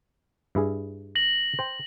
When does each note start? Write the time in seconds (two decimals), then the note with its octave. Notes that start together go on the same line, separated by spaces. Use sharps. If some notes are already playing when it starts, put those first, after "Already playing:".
0.55 G2 E4 G#4
1.15 A#6 F#7
1.59 C5 G5